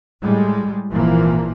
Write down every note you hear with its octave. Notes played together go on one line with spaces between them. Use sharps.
A2 G3 G#3
G#1 A#2 E3 F3 A#3